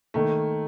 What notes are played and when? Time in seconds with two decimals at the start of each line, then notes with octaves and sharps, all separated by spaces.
0.14 D#3 A3 A#3